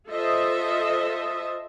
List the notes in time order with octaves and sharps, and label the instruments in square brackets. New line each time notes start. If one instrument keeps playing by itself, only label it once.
[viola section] F4 A4 C5 D#5 E5